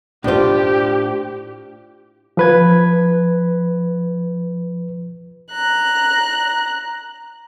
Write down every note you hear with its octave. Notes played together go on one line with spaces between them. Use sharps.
A2 D4 F4 G4 C5
F3 B4 G#6
A#5 F#6